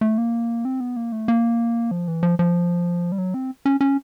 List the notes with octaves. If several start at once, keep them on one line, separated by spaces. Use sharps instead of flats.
A3
A#3
C4
B3
A#3
A3
A#3
F3
E3
F3
F3
G3
F#3
C4
C#4
C#4